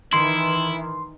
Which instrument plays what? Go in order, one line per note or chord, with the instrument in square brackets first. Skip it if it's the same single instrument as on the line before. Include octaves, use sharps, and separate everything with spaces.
[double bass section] D#3 E3 [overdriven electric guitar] E4 [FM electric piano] C6